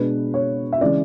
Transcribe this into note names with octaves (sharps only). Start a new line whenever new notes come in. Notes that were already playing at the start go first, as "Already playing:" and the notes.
Already playing: B2 G#3 D4 B4
C#5
E5
C#3 E3 G#3 C#4 D5